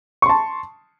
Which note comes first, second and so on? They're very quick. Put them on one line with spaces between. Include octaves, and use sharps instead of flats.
C#6 C6 A5